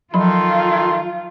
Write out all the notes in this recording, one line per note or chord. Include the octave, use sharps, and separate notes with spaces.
D#3 F3 F#3 F4 A4 B5 C6